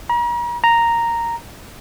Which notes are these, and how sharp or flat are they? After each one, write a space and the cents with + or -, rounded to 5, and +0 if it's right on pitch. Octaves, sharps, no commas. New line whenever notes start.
A#5 +40
A#5 -5